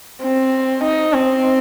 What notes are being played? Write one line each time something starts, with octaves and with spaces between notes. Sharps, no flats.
C4
D#4
C4